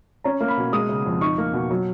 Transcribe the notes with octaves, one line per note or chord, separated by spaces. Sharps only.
C#4 A#5
A#3
B5
B2
G#3 D#6
C#3
F2
D#4 C#6
A#3
B2
F#3